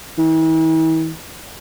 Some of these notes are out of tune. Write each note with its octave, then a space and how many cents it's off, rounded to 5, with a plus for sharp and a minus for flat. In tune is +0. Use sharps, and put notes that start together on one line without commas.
E3 -40